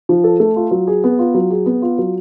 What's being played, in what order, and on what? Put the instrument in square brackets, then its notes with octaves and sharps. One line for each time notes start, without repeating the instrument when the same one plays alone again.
[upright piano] F3
A4
A3
F4
F#3
G#4
B3
F4
F#3
G#4
B3
F4
F#3